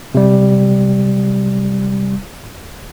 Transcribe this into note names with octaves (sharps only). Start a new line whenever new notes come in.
C3 G3